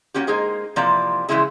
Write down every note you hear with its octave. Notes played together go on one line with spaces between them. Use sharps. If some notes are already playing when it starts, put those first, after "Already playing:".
A#3 C#4 F#4 G4
G#3 A#3 D#4 G#4 C5
C3 E3 F3 A#3 D5 A#5
C#3 E3 F3 G#3 E4 G#4